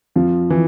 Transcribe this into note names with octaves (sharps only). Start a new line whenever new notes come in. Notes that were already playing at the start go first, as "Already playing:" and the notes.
F2 F3
E3